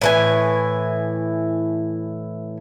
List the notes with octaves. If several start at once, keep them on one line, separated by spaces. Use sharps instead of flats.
A2 E3 G#5